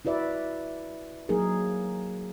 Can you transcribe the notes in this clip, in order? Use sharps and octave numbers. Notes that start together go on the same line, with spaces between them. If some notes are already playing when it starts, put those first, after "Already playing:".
E4 F#4 B4 D5 E5
F#3 A#3 D#4 G#4 A#4